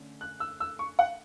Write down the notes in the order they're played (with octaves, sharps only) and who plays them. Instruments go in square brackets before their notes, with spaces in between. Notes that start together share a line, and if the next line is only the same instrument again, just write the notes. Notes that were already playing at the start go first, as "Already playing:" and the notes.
Already playing: [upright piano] D3 A3 C#4
F#6
E6
E6
C#6
F#5